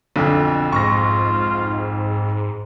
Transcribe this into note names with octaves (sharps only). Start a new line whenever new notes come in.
B1 F2 D3
G#2 F4 C#6 A#6